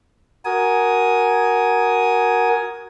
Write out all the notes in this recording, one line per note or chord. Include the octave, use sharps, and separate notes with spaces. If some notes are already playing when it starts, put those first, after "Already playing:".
F#4 A#4 G#5 D#6